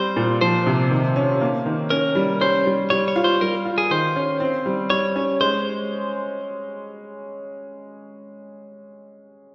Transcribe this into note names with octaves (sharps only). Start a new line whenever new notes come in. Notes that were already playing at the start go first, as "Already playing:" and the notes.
Already playing: G3 C4 C5
A#2
F3 C5
C3
D#3
C#4
A#3
D#3
C#4 A#4
G3
C#4 C5
G3
G3 C#5
C#5
F4
C5
G3 A#4
F4
G#4
D#3 C5
C#4
C4
G3
G3 C#5
C#4
G#3 C5